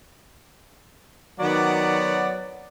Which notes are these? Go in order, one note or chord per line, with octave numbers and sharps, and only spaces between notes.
D#3 F#3 B3 D5 F#5